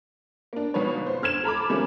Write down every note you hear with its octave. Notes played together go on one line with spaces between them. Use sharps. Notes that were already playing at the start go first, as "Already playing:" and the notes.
A#3 D4
G1 B2 D#4 B4 C#5
C5
D3 F6 G#6 E7
A4 A#5 B5 D6
D#3 F3 G3 A3 C#4 G#4